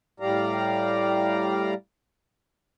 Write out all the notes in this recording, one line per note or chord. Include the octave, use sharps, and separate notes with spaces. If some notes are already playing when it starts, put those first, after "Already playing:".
A2 G3 G4 D5 F5 A#5